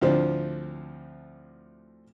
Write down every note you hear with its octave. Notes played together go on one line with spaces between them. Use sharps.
D2 A2 F3 C4 D4